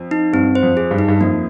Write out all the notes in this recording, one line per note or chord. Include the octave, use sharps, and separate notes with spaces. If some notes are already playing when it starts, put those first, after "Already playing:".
Already playing: F2
D#4
G2 C4
C5
F2
G#4
G2
D#4
G2
F2 A#3